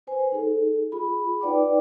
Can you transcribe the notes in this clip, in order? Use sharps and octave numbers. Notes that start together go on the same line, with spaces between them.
B4 C5 G#5
D#4 G#4 A4
F4 G#4 B5
D#4 B4 D5 F#5 G5 D6